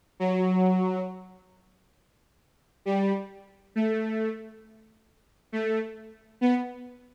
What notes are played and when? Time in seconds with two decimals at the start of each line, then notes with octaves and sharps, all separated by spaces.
0.20 F#3
2.85 G3
3.75 A3
5.52 A3
6.41 B3